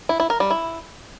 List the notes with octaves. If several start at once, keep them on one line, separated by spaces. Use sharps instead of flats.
E4
E4
A#4
G3
E4